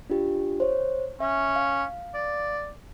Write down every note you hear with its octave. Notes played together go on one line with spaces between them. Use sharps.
D4 F4 G4
C5 C#5
C#4 E5
F5
D5